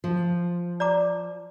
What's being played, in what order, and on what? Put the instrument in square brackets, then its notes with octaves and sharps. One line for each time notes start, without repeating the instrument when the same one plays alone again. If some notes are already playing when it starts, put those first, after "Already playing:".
[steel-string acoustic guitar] F3
[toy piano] D5 A#5 D6